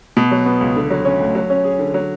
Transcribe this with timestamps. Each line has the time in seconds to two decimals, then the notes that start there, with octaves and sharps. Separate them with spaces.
0.17 B2
0.31 F#3
0.46 B3
0.61 C#2
0.76 D3
0.90 F#3
1.05 C#4
1.20 D2
1.35 F#3
1.50 C#4
1.64 G#4
1.79 D3
1.94 F#3